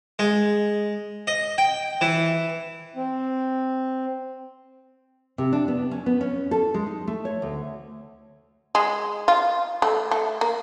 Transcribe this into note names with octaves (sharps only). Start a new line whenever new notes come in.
G#3
D#5
G5
E3
C4
C3
D4
B3
C#4
B3
C#4
A4
G#3
D#4
A3
C#5
D2
G#3
F4
A3
A3
A#3